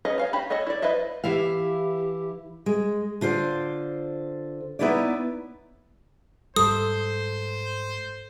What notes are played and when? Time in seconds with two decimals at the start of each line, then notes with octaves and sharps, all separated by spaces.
0.05 C#4 G#4 B4 C#5 D#5
0.18 C#5 F5 G#5
0.33 F#4 G4 B5
0.50 F#4 A4 C#5 D#5 G#5
0.67 E4 D5
0.82 E4 B4 C5 D#5 E5
1.24 E3 E4 G4 F5
2.66 G#3
3.21 D3 F4 C5 D5
4.79 B3 D#4 E4 B4 C#5 D5
6.56 G#2 G3 A4 C5 D#6